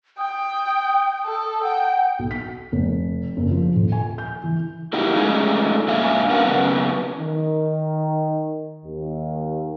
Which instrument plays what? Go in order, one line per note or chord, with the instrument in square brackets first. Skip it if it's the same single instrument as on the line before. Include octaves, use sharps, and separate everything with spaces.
[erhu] G5 [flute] D#6
[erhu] A4
[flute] F#5 [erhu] G5
[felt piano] B1
B6
F1
F#1
F3
D#1
G#5
G6
E3
[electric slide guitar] A#3 D#4 E4 F#4 G4
G#3 A3 C#4 D#4 F4 G#4
G#2 A#3 D4 F#4 E5 G#5
C#4 A#4 B4 F5 F#5
F#2 C#3 B3
[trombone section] D#3
D#2